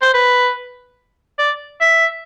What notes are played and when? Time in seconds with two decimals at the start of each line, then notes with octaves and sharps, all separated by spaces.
0.02 C5
0.14 B4
1.39 D5
1.81 E5